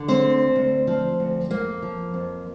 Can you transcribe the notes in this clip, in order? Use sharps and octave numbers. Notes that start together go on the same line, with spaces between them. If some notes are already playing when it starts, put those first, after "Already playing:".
Already playing: D3
C4 C5
D2
D2
F3
D2
F2 A#3
F3
F2